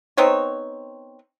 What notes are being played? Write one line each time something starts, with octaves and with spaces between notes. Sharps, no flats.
B3 C4 D#4 C#5